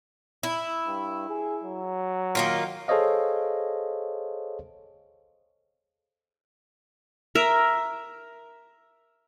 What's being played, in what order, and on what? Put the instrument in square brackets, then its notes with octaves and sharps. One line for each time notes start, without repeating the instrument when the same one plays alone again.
[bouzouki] E4
[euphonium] G2
G#4
F#3
[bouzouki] D#3 A#3 F4
[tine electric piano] G#4 A4 C5 C#5 D#5 F5
[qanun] A#4 E5